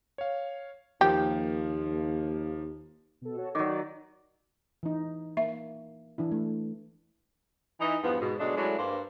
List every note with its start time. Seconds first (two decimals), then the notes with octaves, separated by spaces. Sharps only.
0.18 C#5 F5
1.01 D#2 F3 A#3 G4
3.22 B2 A4
3.36 F#4 A4 C#5
3.55 D#3 F#3 D#4 D5 D6
4.83 E3 D#4
5.37 A#3 E5
6.18 E3 D4 E4
6.32 A3
7.81 E3 D#4
8.03 E2 G2 F3 B3
8.20 G#2 B2
8.39 B2 F#3 G#3 A3 D4
8.56 F#3 G#3 A3 C#4 D4 E4
8.78 G2 A#3 C5